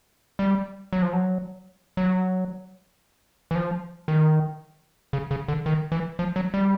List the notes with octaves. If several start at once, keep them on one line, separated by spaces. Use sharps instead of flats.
G3
F#3
F3
F#3
F#3
E3
F3
D#3
C#3
C#3
D3
D#3
E3
F3
F#3
G3